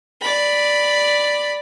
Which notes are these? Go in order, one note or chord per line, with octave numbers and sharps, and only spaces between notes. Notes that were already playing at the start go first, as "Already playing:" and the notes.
D5 B5